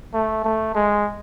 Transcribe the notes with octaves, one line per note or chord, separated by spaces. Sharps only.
A3
A3
G#3